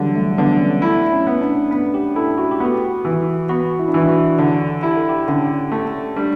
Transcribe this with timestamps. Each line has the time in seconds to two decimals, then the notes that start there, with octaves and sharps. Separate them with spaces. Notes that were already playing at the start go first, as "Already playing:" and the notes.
Already playing: D3 E3 F#3 G3
0.15 A3
0.37 D3 B3
0.59 C#4
0.82 A3 E4
1.12 C#4
1.27 B3
1.41 D4
1.71 B3
1.94 G4
2.16 E4 A4
2.38 F#4
2.51 G4
2.60 B3 F#4
3.05 E3
3.49 B3 F#4
3.79 E4
3.88 D4
3.94 E3 E4
4.09 F#4
4.38 D3
4.83 E4 G4
4.97 A4
5.09 G4
5.28 D3 C#4
5.72 A3
6.16 G3 D4